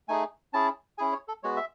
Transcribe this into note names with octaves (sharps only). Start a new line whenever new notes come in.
A3 D#4 G#4 G#5
C#4 E4 G#4 A5
C#4 E4 G#4 G#5
C#5
A4
G#3 B3 F#4 C#5
E5